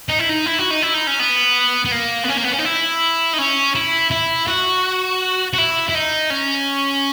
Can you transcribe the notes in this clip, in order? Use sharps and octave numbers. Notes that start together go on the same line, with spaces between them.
D#4
E4
D#4
E4
F#4
D#4
E4
D#4
C#4
B3
B3
A#3
B3
C#4
A#3
B3
C#4
D#4
E4
D#4
C#4
E4
E4
F#4
F#4
E4
E4
D#4
C#4